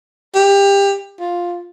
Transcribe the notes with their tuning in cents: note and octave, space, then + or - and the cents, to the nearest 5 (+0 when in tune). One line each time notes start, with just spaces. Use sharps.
G4 +25
F4 +5